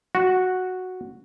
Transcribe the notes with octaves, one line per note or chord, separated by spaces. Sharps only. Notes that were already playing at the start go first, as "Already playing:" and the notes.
F#4